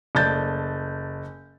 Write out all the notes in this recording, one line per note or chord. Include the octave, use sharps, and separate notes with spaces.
F#1 A3 D5 G6 A6